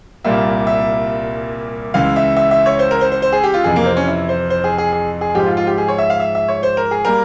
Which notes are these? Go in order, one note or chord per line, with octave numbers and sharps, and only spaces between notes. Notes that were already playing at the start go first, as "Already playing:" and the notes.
C2 A#2 G3 A#3 E5
E5
C#2 C#3 E3 F5
E5
E5
E5
C#5
C5
A#4
C5
C5
C5
G#4
G4
F4
F2 C3 E3 G#4
A#3
C4
C#4
E4
C5
C5
G#4
G#4
G#4
G#4
G#2 F3 G#3 G4
F4
F4
G4
G#4
C#5
E5
F5
E5
E5
C#5
C5
A#4
G#4
G3 A#3 A#4